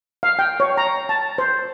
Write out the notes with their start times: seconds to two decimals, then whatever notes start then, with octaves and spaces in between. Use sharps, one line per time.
0.23 F5
0.39 G5
0.60 C#5
0.77 A#5
1.09 A5
1.38 C5